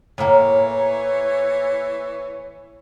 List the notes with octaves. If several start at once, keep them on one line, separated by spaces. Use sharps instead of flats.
A2 E3 A#3 C#5